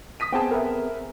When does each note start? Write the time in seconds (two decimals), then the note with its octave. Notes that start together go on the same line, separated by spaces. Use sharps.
0.20 D#6 B6 D#7
0.32 B3 C4 G#4 G5 A5
0.51 A#4 B4 E5